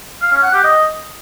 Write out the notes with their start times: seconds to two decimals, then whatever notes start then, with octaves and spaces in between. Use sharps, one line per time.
0.21 F5
0.32 C#4
0.43 F#5
0.53 G4
0.64 D#5